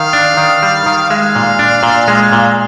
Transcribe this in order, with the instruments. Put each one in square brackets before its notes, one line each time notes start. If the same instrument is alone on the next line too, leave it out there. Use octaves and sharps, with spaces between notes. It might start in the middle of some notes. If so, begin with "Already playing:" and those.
Already playing: [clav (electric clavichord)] D#3 [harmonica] F5
[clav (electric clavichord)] D4
D#3
G3
D#3
[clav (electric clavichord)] G#3 [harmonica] F5
[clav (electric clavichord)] A#2
D4
A#2
G#3
A#2